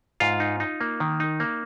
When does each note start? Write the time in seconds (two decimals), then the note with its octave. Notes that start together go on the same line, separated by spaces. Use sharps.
0.20 G#2 F4 F5
0.40 D#4
0.60 D#4
0.81 A#3
1.00 D#3
1.20 D#4
1.40 A#3